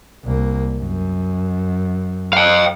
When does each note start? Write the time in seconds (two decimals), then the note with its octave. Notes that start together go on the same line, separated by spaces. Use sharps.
0.25 C2 A#3
0.79 F#2
2.33 F5 G5